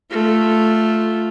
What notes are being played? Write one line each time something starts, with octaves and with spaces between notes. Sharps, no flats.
A3 F4